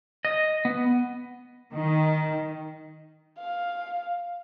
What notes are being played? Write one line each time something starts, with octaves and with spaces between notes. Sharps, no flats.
D#5
B3
D#3
F5